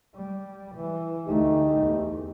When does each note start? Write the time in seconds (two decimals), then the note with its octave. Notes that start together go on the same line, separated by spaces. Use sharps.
0.15 G3
0.76 E3
1.27 D2 A3 D#4 G4
1.79 E2